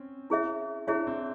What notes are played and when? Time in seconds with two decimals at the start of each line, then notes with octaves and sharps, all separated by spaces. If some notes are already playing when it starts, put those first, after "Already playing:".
Already playing: C4 C#4
0.30 E4 G#4 C#5 E5
0.87 D4 E4 G#4 C#5 E5
1.07 C4